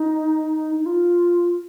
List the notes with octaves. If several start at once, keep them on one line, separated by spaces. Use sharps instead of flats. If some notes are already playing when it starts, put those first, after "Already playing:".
Already playing: D#4
D#4
F4